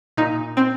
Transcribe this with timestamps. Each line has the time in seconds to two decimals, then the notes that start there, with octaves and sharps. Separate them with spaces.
0.17 A#2 D#4
0.57 C4